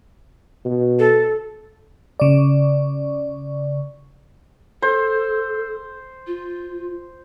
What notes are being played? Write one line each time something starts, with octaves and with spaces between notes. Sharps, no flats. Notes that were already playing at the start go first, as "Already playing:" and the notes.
B2
A4
C#3 D5
A4 C5
F4